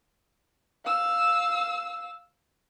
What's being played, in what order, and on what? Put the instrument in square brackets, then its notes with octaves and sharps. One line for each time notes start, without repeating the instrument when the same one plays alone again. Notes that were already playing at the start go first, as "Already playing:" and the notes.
[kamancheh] F5 E6